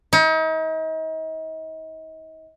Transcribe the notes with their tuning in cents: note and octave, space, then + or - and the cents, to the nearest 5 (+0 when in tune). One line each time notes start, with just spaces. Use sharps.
D#4 +40